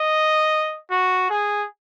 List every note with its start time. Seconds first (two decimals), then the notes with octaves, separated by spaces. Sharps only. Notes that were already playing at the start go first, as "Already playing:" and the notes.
Already playing: D#5
0.91 F#4
1.30 G#4